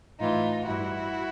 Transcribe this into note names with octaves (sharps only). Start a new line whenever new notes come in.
A2 E3 D#4 F4
G2 E3 E4 F#4